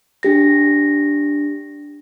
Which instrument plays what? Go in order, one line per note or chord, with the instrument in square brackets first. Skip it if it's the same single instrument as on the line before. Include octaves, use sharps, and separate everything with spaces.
[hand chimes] D4 G4 A#6